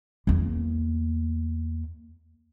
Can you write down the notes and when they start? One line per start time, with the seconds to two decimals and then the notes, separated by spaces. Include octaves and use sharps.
0.27 E2 A#3